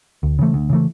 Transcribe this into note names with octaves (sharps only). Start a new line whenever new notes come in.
D2
C#3 E3 A3
D2
C#3 E3 A3